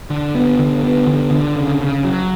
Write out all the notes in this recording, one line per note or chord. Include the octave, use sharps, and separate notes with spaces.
D3
B3
D3
B3
D3
D3
C#3
C#3
F#3